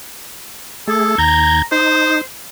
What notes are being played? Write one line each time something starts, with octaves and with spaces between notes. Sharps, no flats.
A3 G#4 A4
D#2 A#5 G6 G#6
D#4 C5